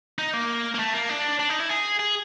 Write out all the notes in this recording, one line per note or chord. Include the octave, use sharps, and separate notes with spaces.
D#4
A#3
A#3
A3
A#3
D4
D4
D#4
E4
G#4
G#4